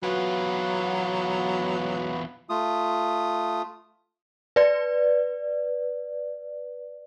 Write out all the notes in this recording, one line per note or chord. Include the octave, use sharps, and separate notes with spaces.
E2 F#3 B3 F4 F#4 B4
A3 F4 D#6
B4 D5